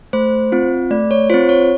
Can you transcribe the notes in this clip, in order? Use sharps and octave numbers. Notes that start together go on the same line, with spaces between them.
A3 C5
C4 F4
A3 D5
C#5
C4 F4 C5
C#5